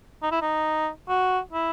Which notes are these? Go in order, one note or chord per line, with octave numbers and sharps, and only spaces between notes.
D#4
E4
D#4
F#4
E4